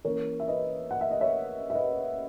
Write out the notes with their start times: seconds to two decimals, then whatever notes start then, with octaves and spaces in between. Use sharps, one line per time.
0.05 E3 A#3 C#4 A#4 C#5
0.40 E5
0.48 B4 D#5
0.91 F#5
1.01 E5
1.11 D#5
1.21 C#5 E5
1.70 E5
1.74 B4 D#5